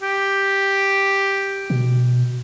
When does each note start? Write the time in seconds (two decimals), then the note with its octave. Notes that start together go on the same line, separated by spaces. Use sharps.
0.02 G4
1.70 B2